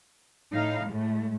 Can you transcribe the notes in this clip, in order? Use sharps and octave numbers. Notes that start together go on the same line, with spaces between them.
A2 D#4 F5
A2 G#3 A3